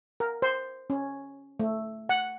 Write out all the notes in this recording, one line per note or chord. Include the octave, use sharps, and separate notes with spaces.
A#4
C5
C#4
A3
F#5